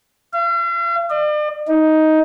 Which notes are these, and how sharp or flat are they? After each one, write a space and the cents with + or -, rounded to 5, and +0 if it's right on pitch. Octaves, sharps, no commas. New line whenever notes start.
F5 -45
D5 +40
D#4 +10